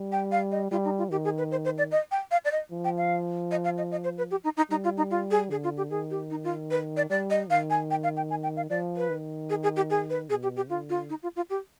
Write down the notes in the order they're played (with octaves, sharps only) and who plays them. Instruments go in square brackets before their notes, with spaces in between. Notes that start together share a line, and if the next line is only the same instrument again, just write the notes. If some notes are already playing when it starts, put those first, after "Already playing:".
Already playing: [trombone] G3
[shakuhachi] G5
F5
D#5
[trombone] G3 [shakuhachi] F4
[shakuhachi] D#4
F4
[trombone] D#3 [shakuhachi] G4
[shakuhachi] G#4
B4
C5
C5
D5
D#5
G5
F5
D5
D#5
[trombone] F3
[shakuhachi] G5
F5
D#5
F5
D#5
D#5
C5
B4
G4
D#4
D#4
[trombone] G3 [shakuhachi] D#4
[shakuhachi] F4
D#4
F4
G#4
[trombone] D3 [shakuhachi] G#4
[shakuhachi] F4
G4
[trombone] D#3 [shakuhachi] G#4
[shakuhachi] G4
D#4
F4
B4
D5
[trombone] G3 [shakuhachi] D5
[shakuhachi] D#5
[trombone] D#3 [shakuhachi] F5
[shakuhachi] G#5
G5
F5
G5
G#5
G5
F5
[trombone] F3 [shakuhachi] D5
[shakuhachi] B4
[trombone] D#3
[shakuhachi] G#4
G#4
G4
G#4
B4
[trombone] B2 [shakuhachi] G#4
[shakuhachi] G4
G4
[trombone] D3 [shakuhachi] F4
[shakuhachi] F4
D#4
F4
F4
G4